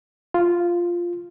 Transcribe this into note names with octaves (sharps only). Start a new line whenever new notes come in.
F4